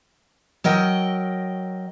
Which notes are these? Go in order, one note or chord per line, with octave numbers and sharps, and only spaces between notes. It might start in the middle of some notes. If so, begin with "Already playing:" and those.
F#3 A#4 D#5 G5